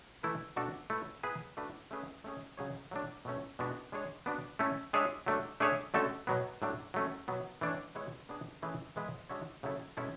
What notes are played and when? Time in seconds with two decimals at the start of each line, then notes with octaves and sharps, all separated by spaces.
0.23 E3 A3 E4 B4
0.56 B2 A3 D4 F#4 A4
0.90 A3 E4 B4
1.23 B3 E4 G#4 B4
1.57 A3 D4 F#4 B4
1.91 A3 C#4 G#4 B4
2.24 A3 C#4 G#4
2.57 C#3 F#3 C#4 G#4 C#5
2.91 F#3 A3 D4
3.25 B2 F#3 A3 C#4
3.59 B2 G#3 B3 D4 F#4
3.92 G#3 D4 G#4 C#5
4.26 B3 D4 F#4
4.59 A3 C#4 E4 A4
4.93 G#3 D4 G#4 C#5 E5
5.26 F#3 A3 D4
5.60 A3 D4 G#4 C#5 E5
5.94 D3 A3 C#4 F#4 A4
6.27 B2 F#3 B3
6.62 A2 F#3 A3 D4
6.94 F#3 A3 C#4
7.28 B2 F#3 B3
7.61 E3 A3 D4 A4 C#5
7.95 G#3 B3 E4 G#4 C#5
8.29 B3 D4 G#4
8.62 E3 A3 C#4 G#4 B4
8.96 E3 G#3 B3 E4 B4
9.29 G#3 D4 F#4 C#5 E5
9.63 C#3 F#3 A3 E4 A4
9.97 B2 G#3 C#4 E4 A4